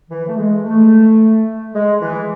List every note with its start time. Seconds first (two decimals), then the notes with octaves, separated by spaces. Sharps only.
0.09 E3
0.28 A3
0.37 G#3
0.64 A3
1.74 G#3
2.01 E3